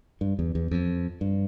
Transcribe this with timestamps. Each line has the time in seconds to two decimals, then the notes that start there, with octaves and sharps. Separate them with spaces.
0.21 G2
0.39 E2
0.55 E2
0.71 F2
1.21 G2